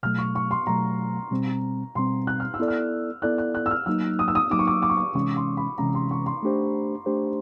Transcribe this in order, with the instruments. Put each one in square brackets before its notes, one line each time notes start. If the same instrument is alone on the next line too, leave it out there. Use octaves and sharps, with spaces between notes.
[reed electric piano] B2 F#3 A3 [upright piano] F6
[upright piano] C#6
C#6
C6
[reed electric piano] B2 F#3 A3 [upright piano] A#5
[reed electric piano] B2 G3 C4
[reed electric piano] B2 G3 C4 [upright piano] C6
[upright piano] F#6
F6
E6
[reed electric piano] B3 E4 A4 D5
[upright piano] F6
[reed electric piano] B3 E4 A4 D5 [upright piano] F#6
[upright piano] F#6
F#6
E6
F6
[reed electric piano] F#3 A#3 D#4 [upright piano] E6
[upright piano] D#6
E6
D#6
[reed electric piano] F#3 A#3 D#4 [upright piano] D6
[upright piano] C#6
D6
D6
C#6
D6
[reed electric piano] C3 E3 G#3 C#4 [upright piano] C#6
[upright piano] C6
B5
[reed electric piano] C3 E3 G#3 C#4 [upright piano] A#5
[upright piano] C6
C#6
C6
[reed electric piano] A3 D4 G4 C5
A3 D4 G4 C5